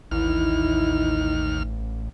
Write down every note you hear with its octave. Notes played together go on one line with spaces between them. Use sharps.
A1 D#2 D#4 E4 F6